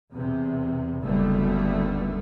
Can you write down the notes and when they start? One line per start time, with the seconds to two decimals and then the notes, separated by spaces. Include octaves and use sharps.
0.13 E2 C3
1.02 F#1 D#2 D3 G3 A3 B3